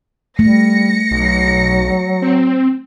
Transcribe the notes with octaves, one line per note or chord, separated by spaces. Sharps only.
G3 A3 A#6 C#7
B1 F#3
C4